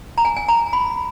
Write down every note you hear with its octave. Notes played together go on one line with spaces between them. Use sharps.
A#5
G#5
G#5
A#5
B5